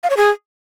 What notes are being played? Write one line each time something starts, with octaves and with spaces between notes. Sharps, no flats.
F5
C#5
G#4